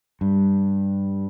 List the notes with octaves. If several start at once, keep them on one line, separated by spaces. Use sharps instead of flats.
G2 G3